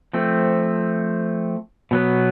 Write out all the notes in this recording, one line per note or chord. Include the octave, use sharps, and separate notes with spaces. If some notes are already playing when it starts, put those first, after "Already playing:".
F3 A3 C4
B2 F#3 B3